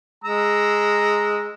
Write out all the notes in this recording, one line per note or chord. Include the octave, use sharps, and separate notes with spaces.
G#3 A#5 E6